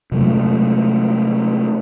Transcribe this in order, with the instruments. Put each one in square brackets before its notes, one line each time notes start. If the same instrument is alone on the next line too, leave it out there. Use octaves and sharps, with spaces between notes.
[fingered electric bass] C3 F#3 G#3 A3